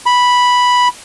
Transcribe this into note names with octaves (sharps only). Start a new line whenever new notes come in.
B5